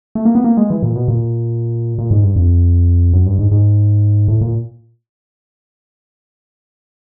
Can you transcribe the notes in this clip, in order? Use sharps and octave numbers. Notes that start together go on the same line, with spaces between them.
A3
A#3
B3
A#3
G#3
E3
A#2
B2
A#2
A#2
G#2
G2
F2
F#2
G2
G#2
G#2
A2
A#2